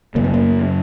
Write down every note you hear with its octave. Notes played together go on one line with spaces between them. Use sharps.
F#2 C#3 A#3
B3
A#3